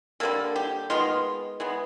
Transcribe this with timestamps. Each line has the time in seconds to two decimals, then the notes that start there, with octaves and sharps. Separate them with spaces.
0.20 D3 G3 A#3 A4
0.56 G4
0.90 D#3 G#3 B3 F4
1.60 E3 G#3 B3